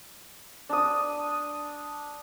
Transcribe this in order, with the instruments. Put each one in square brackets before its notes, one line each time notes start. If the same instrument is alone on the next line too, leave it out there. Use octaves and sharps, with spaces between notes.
[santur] D4 D#6